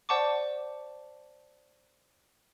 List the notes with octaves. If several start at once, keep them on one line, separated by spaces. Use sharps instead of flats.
C5 D5 F#5 A5 C#6 D6